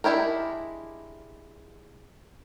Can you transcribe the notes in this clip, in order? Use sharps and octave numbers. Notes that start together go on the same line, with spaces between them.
G#3 D4 E4 G4 A#4